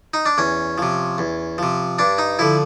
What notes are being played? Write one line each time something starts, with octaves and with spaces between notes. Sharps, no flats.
D#4
D4
E2 C#4
C3 F3
E2
C3 F3
G2 D4
D#4
D3 F3 E4